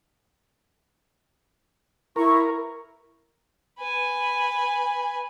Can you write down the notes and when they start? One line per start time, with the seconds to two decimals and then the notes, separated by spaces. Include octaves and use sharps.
2.16 E4 A#4 C#6
3.80 B4 G#5